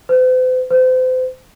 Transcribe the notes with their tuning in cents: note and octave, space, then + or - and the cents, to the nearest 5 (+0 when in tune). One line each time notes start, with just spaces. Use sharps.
C5 -45
C5 -35